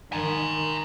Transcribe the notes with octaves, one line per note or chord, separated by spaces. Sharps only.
D#3 G#5 A#5